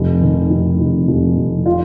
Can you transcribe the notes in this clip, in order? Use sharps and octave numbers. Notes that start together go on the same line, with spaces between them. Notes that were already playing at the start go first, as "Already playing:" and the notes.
Already playing: F1
D#3
F1
F1
F1
F1
F4